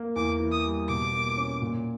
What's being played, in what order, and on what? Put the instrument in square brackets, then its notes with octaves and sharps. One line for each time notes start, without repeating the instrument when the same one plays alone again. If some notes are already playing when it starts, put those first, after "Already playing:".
Already playing: [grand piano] A#3
[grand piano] E2 [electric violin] D6
[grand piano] E3
[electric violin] D#6
[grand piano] G3
[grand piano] B2 [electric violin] D6
[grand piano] A#3
C#4
A#2